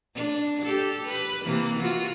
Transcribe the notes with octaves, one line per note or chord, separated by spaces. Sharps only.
D4
G4 A4
B4
C3 E3 A#3
F4 F#4